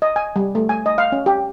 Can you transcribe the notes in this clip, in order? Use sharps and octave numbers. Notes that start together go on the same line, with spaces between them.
D#5
G#5
G3
A3
G#5
D#5
F5
C#4
G4